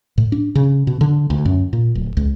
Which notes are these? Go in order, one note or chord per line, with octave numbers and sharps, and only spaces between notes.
A2
D4
C#3
B2
D3
D2
F#2
A#2
D1
C#2